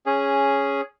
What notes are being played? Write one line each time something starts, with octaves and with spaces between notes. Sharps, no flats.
C#4 G#4